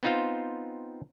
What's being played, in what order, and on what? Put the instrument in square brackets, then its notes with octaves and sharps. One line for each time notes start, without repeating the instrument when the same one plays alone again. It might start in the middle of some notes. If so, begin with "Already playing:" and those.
[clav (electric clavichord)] B3 C4 D#4 F4 C5 F5